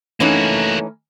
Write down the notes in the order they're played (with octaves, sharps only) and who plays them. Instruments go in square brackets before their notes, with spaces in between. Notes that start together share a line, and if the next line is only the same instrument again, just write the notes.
[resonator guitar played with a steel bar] E3 C#4 D#4 [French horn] A3 [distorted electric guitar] A#3 F#4